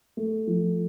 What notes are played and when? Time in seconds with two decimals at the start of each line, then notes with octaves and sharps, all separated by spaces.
0.17 A3
0.47 F3